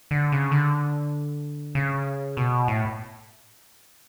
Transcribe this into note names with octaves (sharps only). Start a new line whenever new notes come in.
D3
C#3
D3
C#3
B2
A2